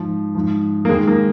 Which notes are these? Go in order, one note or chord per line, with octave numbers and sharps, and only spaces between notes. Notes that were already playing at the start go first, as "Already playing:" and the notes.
Already playing: G#2 F3
G#2 F3
A#3
D#2 D#3 G#3
A#3